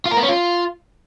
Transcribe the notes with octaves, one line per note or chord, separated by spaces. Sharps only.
F4
A#4
B3
C#4
F4